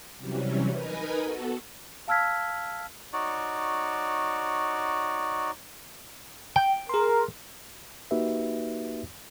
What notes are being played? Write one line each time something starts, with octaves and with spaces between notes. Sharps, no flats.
C3 E3 F#3 G3 C#4
D#4 A#4 B4 D#5 G#5 B5
B3 F#4 A4
F5 A5 E6 F6 G#6 B6
D#4 F#4 C#5 D5
G5
G#4 A#4 C6
A#3 D#4 F#4 G4 B4 E5